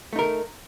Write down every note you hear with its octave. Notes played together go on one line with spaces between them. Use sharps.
A3 D#4 A#4